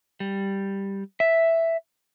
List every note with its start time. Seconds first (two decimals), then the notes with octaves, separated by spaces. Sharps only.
0.20 G3
1.20 E5